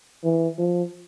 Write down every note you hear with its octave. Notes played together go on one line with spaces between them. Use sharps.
E3
F3